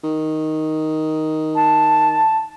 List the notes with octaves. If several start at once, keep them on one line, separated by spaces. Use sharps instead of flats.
D#3
A5